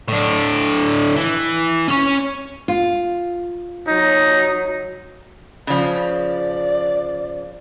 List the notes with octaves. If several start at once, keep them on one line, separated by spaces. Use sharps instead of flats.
A2 D4
E3
C#4 C#5
F4
F#3 D#4
C#3 F3 D5